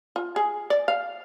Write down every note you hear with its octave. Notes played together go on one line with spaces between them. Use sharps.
F4
G#4
D5
F5